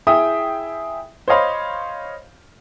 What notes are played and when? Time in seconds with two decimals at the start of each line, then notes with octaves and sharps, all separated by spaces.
0.07 E4 G#4 E5 G5 D#6
1.28 C5 C#5 D#5 F5 B5 C6